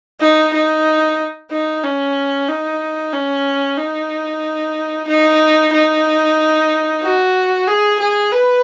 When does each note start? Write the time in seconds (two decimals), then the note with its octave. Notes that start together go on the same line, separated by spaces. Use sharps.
0.21 D#4
0.54 D#4
1.51 D#4
1.84 C#4
2.48 D#4
3.13 C#4
3.78 D#4
5.08 D#4
5.73 D#4
7.03 F#4
7.67 G#4
8.00 G#4
8.32 B4